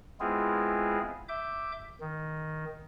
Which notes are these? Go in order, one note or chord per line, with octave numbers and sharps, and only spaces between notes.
G#3 B3 C4 E4 F4 G#4
E5 D6 G6
D#3